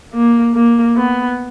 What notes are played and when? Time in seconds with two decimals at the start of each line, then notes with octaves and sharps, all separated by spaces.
0.14 A#3
0.55 A#3
0.97 B3